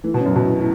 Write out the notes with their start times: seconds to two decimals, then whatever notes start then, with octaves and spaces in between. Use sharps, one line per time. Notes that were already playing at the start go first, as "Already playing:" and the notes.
0.04 E3 A3
0.14 B2
0.21 F#2 C#4
0.36 B2 F#4
0.44 A2
0.53 B3
0.59 A2